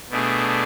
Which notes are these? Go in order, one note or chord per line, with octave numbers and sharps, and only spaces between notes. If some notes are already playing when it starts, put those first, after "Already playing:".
B2 A3 D4 G#4